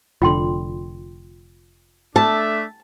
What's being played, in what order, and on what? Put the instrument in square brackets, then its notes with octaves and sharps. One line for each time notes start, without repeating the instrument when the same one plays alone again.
[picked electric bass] F1 D3 [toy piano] F4 G5 C6
[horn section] A3 D4 E5 [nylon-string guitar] A5